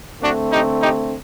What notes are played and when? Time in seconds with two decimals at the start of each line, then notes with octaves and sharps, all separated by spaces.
0.21 D3 A3 C4 D4 F#4
0.51 D#4 G4
0.81 D#4 G4